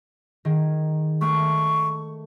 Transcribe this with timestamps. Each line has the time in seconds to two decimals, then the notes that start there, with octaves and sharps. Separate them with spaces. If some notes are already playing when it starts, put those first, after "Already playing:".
0.45 D#3 G#4
1.21 A3 C#6